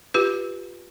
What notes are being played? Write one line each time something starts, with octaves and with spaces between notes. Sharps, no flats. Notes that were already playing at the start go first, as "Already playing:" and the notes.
F4 G4 B4